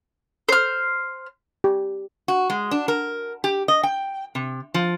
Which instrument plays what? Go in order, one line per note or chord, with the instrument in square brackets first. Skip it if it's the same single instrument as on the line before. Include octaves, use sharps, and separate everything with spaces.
[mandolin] C5 F6
[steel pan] G4
[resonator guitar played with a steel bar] F#4
G#3
D4
A#4
G4
D#5
G5
C3
F3